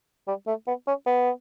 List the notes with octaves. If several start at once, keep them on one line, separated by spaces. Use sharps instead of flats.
G3
A3
B3
C#4
B3